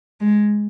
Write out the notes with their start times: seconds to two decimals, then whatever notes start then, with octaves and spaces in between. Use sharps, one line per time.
0.21 G#3